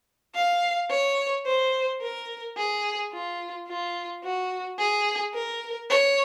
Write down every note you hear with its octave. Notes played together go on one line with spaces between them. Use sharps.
F5
C#5
C5
A#4
G#4
F4
F4
F#4
G#4
A#4
C#5